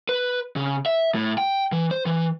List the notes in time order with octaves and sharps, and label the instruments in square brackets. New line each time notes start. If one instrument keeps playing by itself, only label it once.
[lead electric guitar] B4
C#3
E5
A2
G5
E3
C5
E3